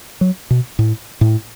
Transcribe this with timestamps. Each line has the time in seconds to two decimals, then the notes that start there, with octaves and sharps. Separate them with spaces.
0.21 F#3
0.51 B2
0.79 A2
1.21 A2